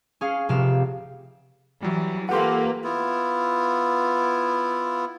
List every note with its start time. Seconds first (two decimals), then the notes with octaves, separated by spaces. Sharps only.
0.21 C#4 G#4 F5
0.49 F1 C3 G4 F5 E7
1.83 E3 F#3 G3
2.29 A#3 F4 G4 A4 B4 F#5 C6
2.84 B3 E4 F4